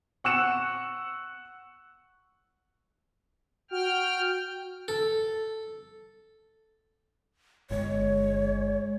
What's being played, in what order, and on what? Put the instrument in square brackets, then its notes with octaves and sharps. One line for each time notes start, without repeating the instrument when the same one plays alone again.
[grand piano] F#5 C#6 E6 F#6 C#7 E7
[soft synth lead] F#4 [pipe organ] G5 F6
[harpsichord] A4
[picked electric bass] G1 [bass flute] G#3 [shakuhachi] C#5